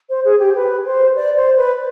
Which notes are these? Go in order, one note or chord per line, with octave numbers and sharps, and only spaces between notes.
C5
G#4
G4
B4
C5
D5
C5
B4